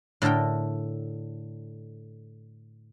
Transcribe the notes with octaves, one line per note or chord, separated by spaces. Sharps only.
A2 D3 A4 A#4 G5